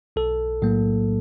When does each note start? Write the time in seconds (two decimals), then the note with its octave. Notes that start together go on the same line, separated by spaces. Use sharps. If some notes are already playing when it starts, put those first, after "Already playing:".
0.16 B1 A4
0.62 A2 F#3 A#3